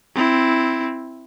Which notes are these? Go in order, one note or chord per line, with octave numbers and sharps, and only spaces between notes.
C4 E4